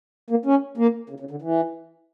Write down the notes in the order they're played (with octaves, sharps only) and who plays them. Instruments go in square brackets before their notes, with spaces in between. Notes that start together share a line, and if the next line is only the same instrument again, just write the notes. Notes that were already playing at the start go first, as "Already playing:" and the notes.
[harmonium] A#3
C#4
A#3
C#3
C#3
D3
E3